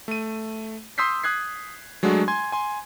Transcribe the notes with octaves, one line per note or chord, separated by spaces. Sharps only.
A3 D#7
C6 D#6 E6 G6 B6 C7
D#6 F#6 G#6 C7
F#3 G#3 A3 D4 F#4
G#5 C6 G#6
G#5 C6